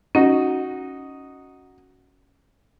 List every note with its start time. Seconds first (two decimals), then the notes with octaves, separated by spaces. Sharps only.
0.15 C#4 D#4 F#4